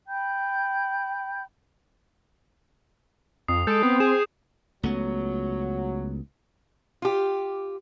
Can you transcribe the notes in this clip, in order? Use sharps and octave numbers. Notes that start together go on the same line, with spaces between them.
G5 B5 G6
F2 D#6 C7
G#3 A4 G6 D7
B3 C4
G#4 E7
C#2 F#3 A3 B3
F4 G4